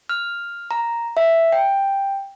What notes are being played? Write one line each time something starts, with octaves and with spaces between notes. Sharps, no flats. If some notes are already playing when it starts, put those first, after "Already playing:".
F6
A#5
E5
G5